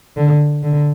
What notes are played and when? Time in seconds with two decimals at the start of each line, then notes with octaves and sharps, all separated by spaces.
0.17 D3
0.63 D3